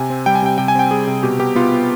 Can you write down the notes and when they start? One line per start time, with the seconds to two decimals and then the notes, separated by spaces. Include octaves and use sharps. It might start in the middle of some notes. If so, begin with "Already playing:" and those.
Already playing: C3 G#5
0.10 C4
0.26 G3 G5
0.35 G#5
0.42 C3 G5
0.58 C3 G5
0.68 G#5
0.75 C4 G5
0.91 G3 G#4
1.07 C3
1.23 B2 G4
1.39 B2 G4
1.55 B3 F4
1.72 B3